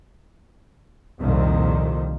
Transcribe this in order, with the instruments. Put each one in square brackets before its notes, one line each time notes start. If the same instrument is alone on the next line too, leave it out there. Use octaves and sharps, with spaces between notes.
[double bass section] C2 F2 A#2 D#3